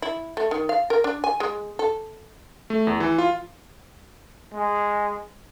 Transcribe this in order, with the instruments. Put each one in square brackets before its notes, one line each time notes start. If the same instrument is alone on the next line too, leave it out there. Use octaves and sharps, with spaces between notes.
[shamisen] E4
A3
D#3
F5
A#4
D4
G#5
G#3
A4
[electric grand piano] A3
E2
E3
F4
[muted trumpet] G#3